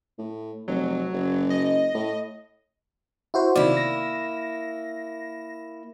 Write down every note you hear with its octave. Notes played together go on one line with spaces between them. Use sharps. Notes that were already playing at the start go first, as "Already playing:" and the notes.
A2
F1 F#3
F#1
D#5
A2
E4 F#4 C5
C3 D#3 A#3 E4 D5
A#6